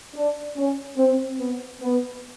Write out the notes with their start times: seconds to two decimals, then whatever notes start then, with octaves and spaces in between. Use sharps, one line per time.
0.15 D4
0.56 C#4
0.98 C4
1.39 B3
1.82 B3